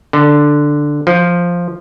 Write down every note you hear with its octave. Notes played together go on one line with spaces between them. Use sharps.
D3
F3